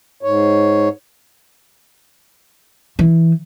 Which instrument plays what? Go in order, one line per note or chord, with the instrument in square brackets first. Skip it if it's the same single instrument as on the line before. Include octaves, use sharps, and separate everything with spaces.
[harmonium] G#2 C#5
[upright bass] E3